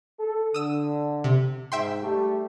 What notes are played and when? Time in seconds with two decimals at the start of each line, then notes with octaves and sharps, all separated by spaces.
0.19 A4
0.54 D3 D#6 E6 D#7
1.24 C3
1.72 G#2 E5 G5 C6
2.02 G3 A3 G4